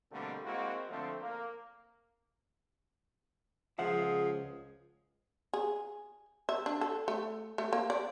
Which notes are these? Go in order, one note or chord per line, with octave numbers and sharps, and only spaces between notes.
B2 D3 G3 A3 A#3 C4
G#3 A#3 C4 E4 F#4
D3 F3 A3 C4
A#3
C#2 F3 G#4 E5 F#5
G#4
E5
D4
A4
A3
A3
A#3
D5